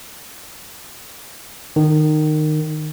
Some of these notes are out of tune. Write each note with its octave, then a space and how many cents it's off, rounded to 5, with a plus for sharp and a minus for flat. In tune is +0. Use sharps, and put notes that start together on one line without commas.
D#3 -20